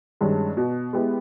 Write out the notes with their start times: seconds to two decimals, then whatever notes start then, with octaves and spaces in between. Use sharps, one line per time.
0.21 G2 D#3 G#3 C#4
0.57 B2
0.93 G#3 B3 E4 G4